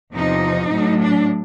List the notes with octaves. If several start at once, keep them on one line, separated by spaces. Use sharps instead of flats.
E2 C3 F3 D#4
A2 F#3 A3
D4